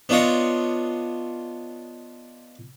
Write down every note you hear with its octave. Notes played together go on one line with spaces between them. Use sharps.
B3 D4 F4 C#5 D#5